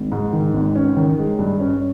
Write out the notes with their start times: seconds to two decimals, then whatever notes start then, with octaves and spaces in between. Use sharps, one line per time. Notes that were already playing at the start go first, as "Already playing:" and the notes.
Already playing: G#1
0.12 G#2
0.33 D#3
0.54 G#1
0.76 C#4
0.96 D#3
1.18 G#3
1.39 G2
1.60 C#4